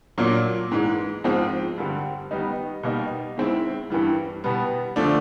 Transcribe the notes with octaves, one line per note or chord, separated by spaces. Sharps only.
A#2 F#3 A#3 D4
G#2 E3 G#3
G#2 F3 G#3 C4
G2 D3 G3
D#3 G3 B3 D#4
B2 G3 A#3 D#4
D#3 G#3 C4 E4
G2 E3 G3
B2 G3 B3
D3 F3 A3 D4